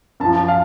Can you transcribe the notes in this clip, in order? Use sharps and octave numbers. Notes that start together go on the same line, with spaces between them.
F#2 F3 A5
F5